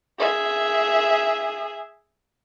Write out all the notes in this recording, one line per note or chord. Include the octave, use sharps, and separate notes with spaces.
G#4 E5